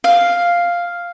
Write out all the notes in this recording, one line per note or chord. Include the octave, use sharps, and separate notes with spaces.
F5